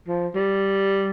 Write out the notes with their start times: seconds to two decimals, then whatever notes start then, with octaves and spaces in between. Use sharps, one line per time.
0.08 F3
0.35 G3